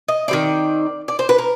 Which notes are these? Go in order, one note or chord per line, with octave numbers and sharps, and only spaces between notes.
D#5
D#3 G3 C4 D5
D5
C5
B4
A#4